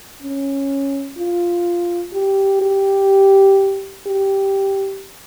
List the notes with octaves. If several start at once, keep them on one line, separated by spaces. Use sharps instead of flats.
C#4
F4
G4
G4
G4